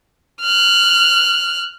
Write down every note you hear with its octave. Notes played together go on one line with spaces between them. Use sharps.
F6 F#6